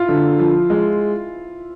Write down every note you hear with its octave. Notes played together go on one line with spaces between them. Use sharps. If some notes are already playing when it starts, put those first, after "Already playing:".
Already playing: E4 F4
D3
F3
G#3